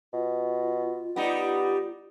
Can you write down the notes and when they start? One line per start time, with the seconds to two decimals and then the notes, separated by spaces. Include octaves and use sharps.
0.14 B2 F4
1.16 G3 B3 D#4